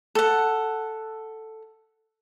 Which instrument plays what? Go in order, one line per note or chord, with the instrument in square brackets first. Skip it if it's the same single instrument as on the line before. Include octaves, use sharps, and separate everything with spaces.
[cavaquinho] A4 F#5